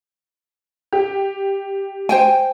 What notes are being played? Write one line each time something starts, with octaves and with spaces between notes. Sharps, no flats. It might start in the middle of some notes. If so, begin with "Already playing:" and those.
G4
C5 G5 G#5